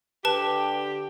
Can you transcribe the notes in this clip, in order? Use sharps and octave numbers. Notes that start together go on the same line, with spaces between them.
D3 G4 B4 A5